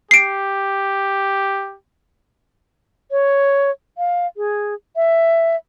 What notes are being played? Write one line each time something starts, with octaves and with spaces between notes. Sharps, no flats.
G4 C7 D7
C#5
F5
G#4
E5